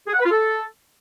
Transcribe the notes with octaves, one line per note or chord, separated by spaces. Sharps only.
G#4
F#5
B4
F4
A4